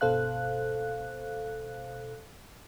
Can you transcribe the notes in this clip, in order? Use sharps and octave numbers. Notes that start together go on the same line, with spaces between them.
G1 B2 A4 C5 F5 F#6